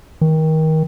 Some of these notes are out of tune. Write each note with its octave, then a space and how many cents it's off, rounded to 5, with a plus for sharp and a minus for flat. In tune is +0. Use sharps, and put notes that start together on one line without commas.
D#3 +25